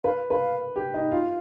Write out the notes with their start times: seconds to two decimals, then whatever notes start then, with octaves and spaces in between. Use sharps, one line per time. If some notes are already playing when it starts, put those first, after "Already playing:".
0.04 B4 F5
0.30 B4 F5
0.76 G4
0.94 D#4
1.11 F4 F5